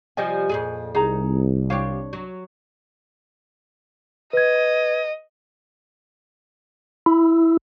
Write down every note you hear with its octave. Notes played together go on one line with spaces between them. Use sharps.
C3 F3 G3 D#5 G#5
F2 A#2 G#4
C2 D#4 G#4 A#5
D4 F4 G4 C#5
F#3
B4 D#5 G#6
E4